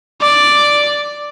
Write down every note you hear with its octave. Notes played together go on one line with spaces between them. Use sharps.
D5